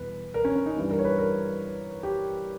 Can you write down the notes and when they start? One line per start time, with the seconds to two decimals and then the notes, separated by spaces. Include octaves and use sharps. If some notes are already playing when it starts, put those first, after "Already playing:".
Already playing: E2 B2 G3 B4
0.34 A#4
0.45 C#4
0.56 C#4
0.66 D#4
0.76 G2 E3 G3
0.91 A#4
0.99 C#5
1.04 B4
1.19 A#4
2.03 G4